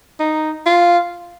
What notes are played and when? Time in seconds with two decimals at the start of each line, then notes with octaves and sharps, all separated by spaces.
0.20 D#4
0.66 F4